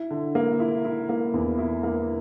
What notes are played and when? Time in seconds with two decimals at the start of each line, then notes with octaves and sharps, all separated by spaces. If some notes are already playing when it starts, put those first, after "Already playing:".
Already playing: E4
0.11 D3
0.35 A#3
0.60 E4
0.85 E4
1.09 A#3
1.34 E2
1.59 E4
1.83 A#3